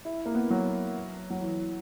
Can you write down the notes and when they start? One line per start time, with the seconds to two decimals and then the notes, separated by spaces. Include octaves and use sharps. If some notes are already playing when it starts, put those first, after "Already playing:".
0.05 E4
0.26 A#3
0.35 B3
0.50 F#3
1.30 F#3
1.40 E3